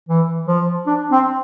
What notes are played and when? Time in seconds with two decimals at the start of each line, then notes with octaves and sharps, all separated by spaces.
0.09 E3
0.48 F3
0.87 D4
1.12 C4